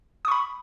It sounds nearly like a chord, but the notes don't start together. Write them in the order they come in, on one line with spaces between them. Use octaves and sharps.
D#6 C#6 B5